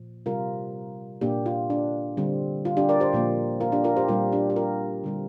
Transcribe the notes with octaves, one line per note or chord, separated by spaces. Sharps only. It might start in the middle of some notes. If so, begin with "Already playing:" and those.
Already playing: A#2 F3
C3 G3 C4 F4 A#4
A#2 A#3 D4 G4
F4
D4
D3 G3 C4
F4
D4 G4
A#4 D5
G4 C5
A#2 F3 A#3
F4 A#4
D4 G4
F4 A#4
G4 C5
A#2 G3 C4 F4 A#4
D4 G4
G4
F4 A#4
D3 G3 C4